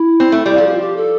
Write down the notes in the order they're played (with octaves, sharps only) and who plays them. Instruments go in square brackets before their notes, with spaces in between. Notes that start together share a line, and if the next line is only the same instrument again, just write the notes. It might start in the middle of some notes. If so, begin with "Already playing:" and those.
Already playing: [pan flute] E4
[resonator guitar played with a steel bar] C4
A3
G3
[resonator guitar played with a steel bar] F3 [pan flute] A4
[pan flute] G4
F4
G4
A4